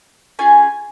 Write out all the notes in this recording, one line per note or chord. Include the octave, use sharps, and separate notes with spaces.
C#4 F4 G#4 G#5